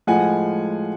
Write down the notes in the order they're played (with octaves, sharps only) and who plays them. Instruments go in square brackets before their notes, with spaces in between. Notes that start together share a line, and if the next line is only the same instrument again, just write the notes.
[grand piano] A2 F3 G#3 F#5 G#5